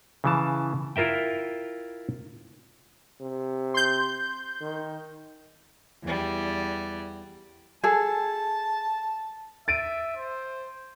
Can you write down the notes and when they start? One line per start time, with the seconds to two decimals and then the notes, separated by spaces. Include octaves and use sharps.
0.24 C#3 E3 A5
0.96 E4 F4 A#4 E5 G5
3.21 C3
3.74 C6 G6
4.61 D#3
6.03 E2 G3
7.84 G#4 A4 A5
9.68 E5 A6 D7 D#7
10.17 C5